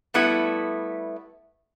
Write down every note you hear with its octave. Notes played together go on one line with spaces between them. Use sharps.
G3 A3 B3 E4